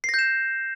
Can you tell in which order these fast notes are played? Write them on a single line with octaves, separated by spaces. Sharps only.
C7 A#6 G6 E7